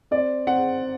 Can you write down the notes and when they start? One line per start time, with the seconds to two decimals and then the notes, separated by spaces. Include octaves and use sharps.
0.11 C4 D5
0.47 C4 F#5